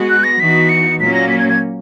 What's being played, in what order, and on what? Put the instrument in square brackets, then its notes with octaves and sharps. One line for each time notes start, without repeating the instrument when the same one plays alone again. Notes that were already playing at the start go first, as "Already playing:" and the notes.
Already playing: [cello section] G#3 B3 F#4
[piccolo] F#6
A#6
[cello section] E3 B3 D#4 F#4 [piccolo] B6
[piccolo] C#7
[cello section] A#2 F#3 A#3 C#4 [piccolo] B6
[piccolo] A#6
B6
G#6
G#6